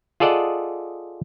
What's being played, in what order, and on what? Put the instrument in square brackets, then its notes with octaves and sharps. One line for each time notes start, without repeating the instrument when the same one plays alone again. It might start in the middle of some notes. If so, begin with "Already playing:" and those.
[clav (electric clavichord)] F4 G#4 A4 D5 D#5 F#5